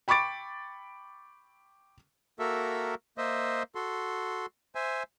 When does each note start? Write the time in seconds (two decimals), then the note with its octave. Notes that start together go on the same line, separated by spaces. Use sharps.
0.08 G5 B5 C#6 D6 A6 D7
2.39 A#3 F#4 A4 A#4 E5
3.18 A#3 C5 D#5 E5
3.75 F#4 A4 C6
4.75 C5 E5 G#5